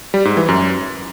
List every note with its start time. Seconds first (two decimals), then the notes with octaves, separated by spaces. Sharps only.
0.14 G3
0.25 G#2
0.37 E3
0.48 F#2